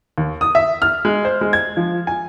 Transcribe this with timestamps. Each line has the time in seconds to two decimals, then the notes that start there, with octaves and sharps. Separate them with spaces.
0.18 D#2
0.41 D#6
0.55 E5
0.82 F6
1.05 G#3
1.25 C5
1.41 G#3
1.53 G#6
1.77 F3
2.07 G#5